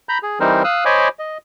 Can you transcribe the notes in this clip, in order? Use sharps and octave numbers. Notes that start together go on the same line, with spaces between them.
A#5 B5 G6
G#4
E3 G3 C4 D#4 A#4 C5
F5 D#6 E6 F#6
C5 C#5 D#5 G#5 B5 D6
D#5